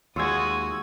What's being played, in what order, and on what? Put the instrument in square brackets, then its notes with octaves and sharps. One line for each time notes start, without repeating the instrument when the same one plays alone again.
[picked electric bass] D#2 [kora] G#3 F4 [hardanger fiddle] F#4 D#6 [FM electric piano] C#6 E6 G#6